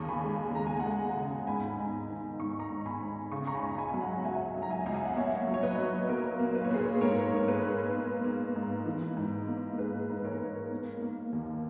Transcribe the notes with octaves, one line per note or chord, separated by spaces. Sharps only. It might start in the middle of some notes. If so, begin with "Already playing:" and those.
Already playing: D#2 C#3 A#5 C#6
G#5 B5
G#3
G#3 A#5
G#5
F#5 A#5
G#3
C#3
G#2 G#5 B5
G#2
D#3
G#2 C#6
A#5 C#6
G#2
G#5 B5
G#2
C#3 C#6
A#5 C#6
G#5 B5
C#2
G#5 B5
F#3 G#5
F#5 A#5
C#2 E5 G#5
F#3
A#5
E5 G#5
C#2
G#5
F#5
A#3 C#5 E5
F#3
C#5
B4 D#5
F#3
A#2 A#4
A#3
B4
C#5
A#2 G#4 B4
G#2 A#4 C#5
G#2 C#5
G#4 B4
G#2
A#3
A#3
G#2
E3
G#2
A#3
G#2 G#4 B4
G#2
A#4 C#5
G#2
A#3
A#3
D#2